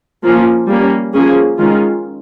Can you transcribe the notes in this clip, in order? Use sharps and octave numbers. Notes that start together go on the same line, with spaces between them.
F3 A#3 C#4
G3 A#3 C#4
F3 A#3 C#4 G#4
D#3 G#3 C#4 F4